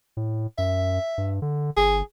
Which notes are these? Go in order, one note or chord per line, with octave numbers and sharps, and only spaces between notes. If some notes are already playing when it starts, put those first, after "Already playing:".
A2
F#2 E5
G2
D3
G1 G#4